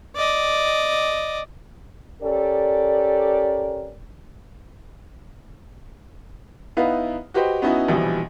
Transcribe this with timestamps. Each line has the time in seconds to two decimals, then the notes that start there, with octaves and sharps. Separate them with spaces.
0.16 D5 D#5
2.23 C#4 G4 A4 A#4 D5
6.77 B3 D#4 E4 B4 F5
7.34 F#4 G4 B4 C5 D#5 G5
7.62 B3 C#4 D#4 E4 F#4
7.88 A#1 B2 E3 F3 G3